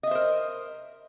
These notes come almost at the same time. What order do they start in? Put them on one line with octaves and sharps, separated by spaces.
D#5 E5 C5 A#4